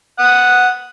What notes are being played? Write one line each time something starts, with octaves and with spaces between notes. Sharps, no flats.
F#5 D#6